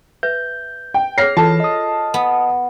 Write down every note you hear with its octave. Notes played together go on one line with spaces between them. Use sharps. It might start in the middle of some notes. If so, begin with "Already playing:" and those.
B4 E5 G6
G5
G#4 C#5 F6 A#6 C7
E3 F4 A4 A5
D#5 D#6
B3